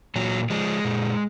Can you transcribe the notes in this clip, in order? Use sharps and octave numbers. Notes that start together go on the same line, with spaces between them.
A#2 F#3
F3 G#3
A#2